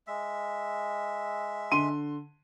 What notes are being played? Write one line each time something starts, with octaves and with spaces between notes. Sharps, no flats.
G#3 E5
D3 C6 D#7